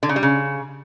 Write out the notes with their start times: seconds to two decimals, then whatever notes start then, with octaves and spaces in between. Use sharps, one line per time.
0.03 D3
0.09 C#3
0.16 G3
0.23 C#3